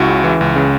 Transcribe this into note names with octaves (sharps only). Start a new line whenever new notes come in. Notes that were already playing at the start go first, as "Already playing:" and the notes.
Already playing: C#2 E4 F#4
C#3
E3
C#2
C#3